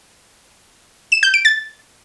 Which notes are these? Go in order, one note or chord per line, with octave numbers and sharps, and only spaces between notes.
E7
G6
D7
A6